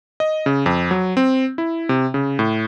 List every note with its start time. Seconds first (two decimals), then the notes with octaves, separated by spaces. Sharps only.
0.20 D#5
0.46 C#3
0.66 F2
0.91 F#3
1.17 C4
1.58 E4
1.89 C3
2.14 C#3
2.39 A2